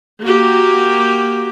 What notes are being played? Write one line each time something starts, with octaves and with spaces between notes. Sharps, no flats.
A#3 F#4 G4